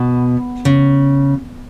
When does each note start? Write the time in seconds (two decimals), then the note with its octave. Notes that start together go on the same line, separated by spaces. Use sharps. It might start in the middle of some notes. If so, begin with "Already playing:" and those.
Already playing: B2
0.65 C#3